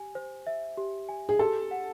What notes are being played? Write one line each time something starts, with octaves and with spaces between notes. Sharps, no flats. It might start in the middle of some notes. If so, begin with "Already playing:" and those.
Already playing: G4 G#5
C5
E5
G4
G#5
G#4
G4 A4
F#5